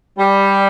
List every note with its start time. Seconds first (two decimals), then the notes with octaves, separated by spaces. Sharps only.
0.19 G3